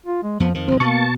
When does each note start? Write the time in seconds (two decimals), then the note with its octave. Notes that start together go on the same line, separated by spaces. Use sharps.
0.06 F4
0.23 G#3
0.40 F2 F3 B3
0.54 F2 D#3 F3
0.68 G1 C2 C4
0.80 B2 A#3 B3 A5 C#6